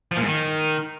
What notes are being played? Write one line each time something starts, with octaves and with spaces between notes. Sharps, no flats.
F3
A#2
G#2
D#3